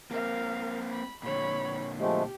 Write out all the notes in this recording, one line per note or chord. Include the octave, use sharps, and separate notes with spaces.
A#3 C4 A#4 F5
B5
A#2 D3 C#5 B5
F3 G#3 A3 G4